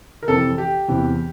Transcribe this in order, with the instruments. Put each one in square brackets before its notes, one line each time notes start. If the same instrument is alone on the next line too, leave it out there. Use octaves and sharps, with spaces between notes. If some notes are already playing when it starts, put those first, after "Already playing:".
[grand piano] A#4
F2 C3 E3 A4
G4
E2 C3 E3